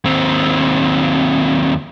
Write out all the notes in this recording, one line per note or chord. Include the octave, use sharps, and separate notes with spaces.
D#2 C4